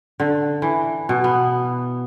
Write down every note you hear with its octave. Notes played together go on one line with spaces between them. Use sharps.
D3
E3
B2
B3